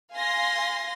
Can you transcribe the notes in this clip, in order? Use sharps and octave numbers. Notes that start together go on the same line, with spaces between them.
F5 G#5 C6 A#6